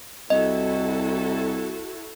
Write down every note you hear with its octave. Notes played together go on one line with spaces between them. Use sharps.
C2 E4 F#4 A4 D#5